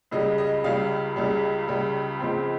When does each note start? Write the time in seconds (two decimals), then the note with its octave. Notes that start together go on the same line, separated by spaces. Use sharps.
0.11 C#2 C#3 G3 D#5
0.38 D#5
0.64 C#2 C#3 G3 F5
1.16 C#2 C#3 G3
1.68 C#2 C#3 G3
2.19 C#2 C#3 F3 C4